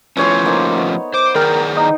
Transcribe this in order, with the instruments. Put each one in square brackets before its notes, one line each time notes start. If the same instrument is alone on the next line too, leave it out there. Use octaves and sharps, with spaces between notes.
[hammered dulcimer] E3 C#5 C6 [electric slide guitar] F3 A3 C#4
[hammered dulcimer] A#3 D#4 C5
B3 C#5
[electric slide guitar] C5 [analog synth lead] D6
[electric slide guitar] D#3 G#4 D5 [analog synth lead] A#4 [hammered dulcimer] G5
[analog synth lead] D#4